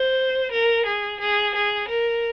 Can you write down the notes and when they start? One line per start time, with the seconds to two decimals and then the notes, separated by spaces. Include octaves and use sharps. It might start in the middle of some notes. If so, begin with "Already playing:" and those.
Already playing: C5
0.52 A#4
0.86 G#4
1.21 G#4
1.55 G#4
1.89 A#4